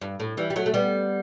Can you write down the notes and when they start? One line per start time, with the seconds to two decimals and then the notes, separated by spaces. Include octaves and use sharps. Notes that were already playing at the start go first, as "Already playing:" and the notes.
0.02 G2
0.20 A2
0.37 E3 G3
0.50 G3
0.56 F#3 A3
0.66 A3
0.74 G3 B3